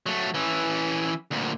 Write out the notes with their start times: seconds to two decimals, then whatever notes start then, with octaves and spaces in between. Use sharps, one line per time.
0.06 F#3 A3
0.34 E3 C#4
1.31 D2 A#2